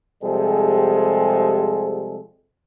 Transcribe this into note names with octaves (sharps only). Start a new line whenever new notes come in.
C3 F3 G3 G#3 G#4 A4